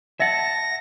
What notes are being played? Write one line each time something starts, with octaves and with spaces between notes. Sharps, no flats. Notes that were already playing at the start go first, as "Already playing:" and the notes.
E5 F#5 A5 A#6